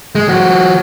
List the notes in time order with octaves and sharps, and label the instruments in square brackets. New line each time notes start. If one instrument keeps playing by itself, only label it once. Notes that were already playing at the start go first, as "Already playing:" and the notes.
[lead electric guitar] G#3
F3 F#4